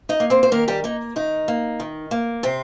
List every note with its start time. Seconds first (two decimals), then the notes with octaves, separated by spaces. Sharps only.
0.09 D#4 D#5
0.20 A#3
0.30 C4 C5
0.43 C5
0.52 D#3 A#3 A#4
0.68 G3 G4
0.84 A#3 D#4
1.16 D#3 D#4
1.48 A#3
1.80 D#3
2.11 A#3
2.43 C3 C4